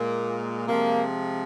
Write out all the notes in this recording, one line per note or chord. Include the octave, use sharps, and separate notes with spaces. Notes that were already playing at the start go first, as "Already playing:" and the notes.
Already playing: A#2 G#3 A#3
C3 F3 G#3 A#3